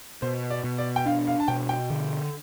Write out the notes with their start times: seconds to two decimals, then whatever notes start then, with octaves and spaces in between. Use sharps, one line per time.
0.22 B2 C5
0.50 D5
0.64 B2
0.78 D5
0.96 G5
1.06 D4 F5
1.27 F5
1.40 A5
1.48 B2 G5
1.69 G5
1.90 D3